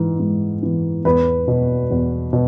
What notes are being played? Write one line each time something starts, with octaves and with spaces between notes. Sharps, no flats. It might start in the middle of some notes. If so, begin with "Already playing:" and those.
Already playing: G#2 E3
G#2
E3
E2 B4
B2
E2
B2